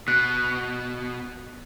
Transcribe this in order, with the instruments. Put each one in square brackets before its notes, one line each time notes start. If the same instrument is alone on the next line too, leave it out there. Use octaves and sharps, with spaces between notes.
[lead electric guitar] B2 [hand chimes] F#6